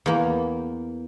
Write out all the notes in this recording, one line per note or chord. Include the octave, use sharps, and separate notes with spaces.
E2 A#3